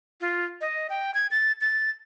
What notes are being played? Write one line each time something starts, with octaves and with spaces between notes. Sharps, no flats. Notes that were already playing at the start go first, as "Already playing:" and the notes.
F4
D#5
G5
G#6
A6
A6